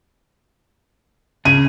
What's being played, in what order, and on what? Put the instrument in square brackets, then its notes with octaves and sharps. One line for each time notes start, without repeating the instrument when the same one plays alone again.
[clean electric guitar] C#3 G#4 [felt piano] D#7